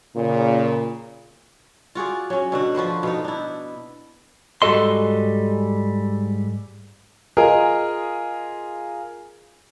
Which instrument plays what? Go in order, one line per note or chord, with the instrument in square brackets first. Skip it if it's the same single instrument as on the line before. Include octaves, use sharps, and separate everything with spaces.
[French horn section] A#2 C#3
[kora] F4 F#4 G#4 D5
F#3 C#4
B2 D3 F#4
F3 F#4 B4 C5
B2 B3 D#4
D4 E4
[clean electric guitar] G#2 G3 F#4 A4 D#5 C6
[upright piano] F4 G#4 A#4 D#5